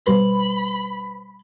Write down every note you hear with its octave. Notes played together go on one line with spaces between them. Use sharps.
B2 G3 B4 C5 B5 C6